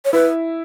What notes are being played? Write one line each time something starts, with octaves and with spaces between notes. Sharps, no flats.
C#5
E4 B4